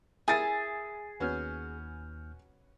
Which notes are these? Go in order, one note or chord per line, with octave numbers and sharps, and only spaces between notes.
E4 G#4 A#4 E5 G#5 A6
D#2 B3 C#4 F#4 F6 G6